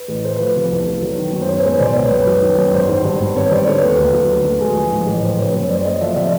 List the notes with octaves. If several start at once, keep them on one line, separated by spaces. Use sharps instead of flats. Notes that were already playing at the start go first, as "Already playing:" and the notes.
Already playing: B4
A1
A3 C5
F3 B4
C3 B4
C2
A3
F#3
D#3
F#2
C5
B3 B4 C#5
C5
G#3 B4 C#5
B2 C5 D5
C#2 B4 C#5
F#2 B4 C#5
F#3
D#3
F#2
G#1 C5
D#3
G2
G#1
C4 B4 C#5
G3 C5 D5
D3 B4 C#5
D#2 B4
D2
F#3
D3
D2
G#3
F3
G#2
A1
F3 C5
C#3 B4 C#5
F#2 B4 C#5
F#1 C5 D5
A3 C#5 D#5
F3 D5 E5
C3 D5 E5